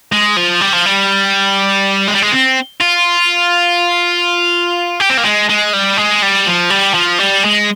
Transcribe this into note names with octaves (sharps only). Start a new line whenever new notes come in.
G#3
F3
G3
F3
G3
G#3
G3
G#3
C4
F4
G4
C4
A#3
G#3
G#3
G3
G#3
G3
F3
G3
F3
G3
G#3